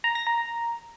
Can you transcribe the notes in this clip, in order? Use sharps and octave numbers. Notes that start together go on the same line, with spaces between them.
A#5
A#6
A#5